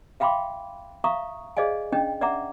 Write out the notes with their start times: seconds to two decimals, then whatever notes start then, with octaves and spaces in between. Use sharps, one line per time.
0.20 E5 F5 G5 B5 C6 D6
1.04 E5 F5 A#5 C#6 D#6
1.57 G#4 C5 D5 D#5 F5 G#5
1.92 C#4 D4 D#5 G5
2.21 D5 E5 F#5 A#5 D6